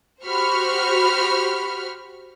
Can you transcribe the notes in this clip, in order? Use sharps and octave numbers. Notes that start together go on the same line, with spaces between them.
F#4 G4 C5 B5 C#6 F6